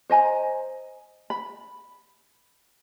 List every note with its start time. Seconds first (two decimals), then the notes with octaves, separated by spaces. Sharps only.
0.10 C5 D#5 G#5 A#5
1.30 B5